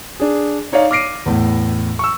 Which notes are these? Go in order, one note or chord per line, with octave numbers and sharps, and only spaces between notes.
D4 G#4
D#4 C#5 D5 F5
D6 F6 A#6 C7 D7 D#7
E2 A2
C#6 E6